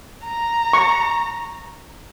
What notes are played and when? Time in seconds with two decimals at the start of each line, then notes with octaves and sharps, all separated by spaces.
0.25 A#5
0.73 C#6